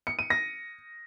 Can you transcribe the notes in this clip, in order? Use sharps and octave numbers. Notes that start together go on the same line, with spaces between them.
C#7
D#7
A#6